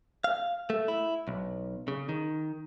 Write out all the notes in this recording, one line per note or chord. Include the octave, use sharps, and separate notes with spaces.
F5
A3
E4
B1
C#3
D#3